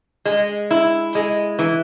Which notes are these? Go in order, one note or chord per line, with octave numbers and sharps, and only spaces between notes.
G#3
E4
G#3
E3